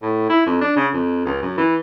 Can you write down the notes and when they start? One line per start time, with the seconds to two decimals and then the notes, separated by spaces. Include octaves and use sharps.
0.02 A2
0.29 E4
0.46 F2
0.61 D4
0.77 C#3
0.94 F2
1.26 C#2
1.42 F#2
1.58 E3